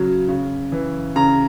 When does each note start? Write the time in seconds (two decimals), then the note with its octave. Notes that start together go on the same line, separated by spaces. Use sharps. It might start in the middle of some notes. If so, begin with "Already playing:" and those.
Already playing: C#3 F#3
0.29 C#3
0.72 E3
1.16 C#3 A#5